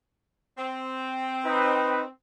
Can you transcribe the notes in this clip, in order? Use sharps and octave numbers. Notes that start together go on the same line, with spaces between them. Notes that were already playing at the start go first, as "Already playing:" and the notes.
C4
D#4 B4